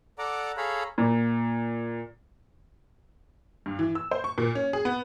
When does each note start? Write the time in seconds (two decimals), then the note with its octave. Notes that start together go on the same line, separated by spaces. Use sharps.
0.18 A4 D5 F#5 A#5 D6
0.57 G#4 A4 C#5 F5 A#5 B5
0.98 A#2
3.66 G2
3.79 E3
3.95 E6
4.11 C5
4.24 C#6
4.38 A#2
4.55 C#4
4.73 G#4
4.85 B3